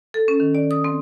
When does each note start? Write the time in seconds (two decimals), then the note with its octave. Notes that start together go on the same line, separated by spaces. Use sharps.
0.14 A4
0.28 C#4
0.40 D#3
0.55 D5
0.71 D#6
0.84 C4